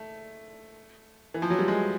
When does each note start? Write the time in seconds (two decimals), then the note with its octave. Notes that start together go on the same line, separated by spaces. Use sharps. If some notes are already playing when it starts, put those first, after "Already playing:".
Already playing: A3
1.34 E3
1.42 F3
1.50 F#3
1.59 G3
1.68 G#3